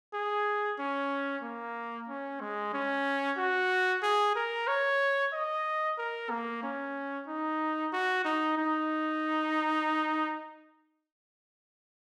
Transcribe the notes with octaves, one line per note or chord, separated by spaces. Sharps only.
G#4
C#4
A#3
C#4
G#3
C#4
F#4
G#4
A#4
C#5
D#5
A#4
A#3
C#4
D#4
F#4
D#4
D#4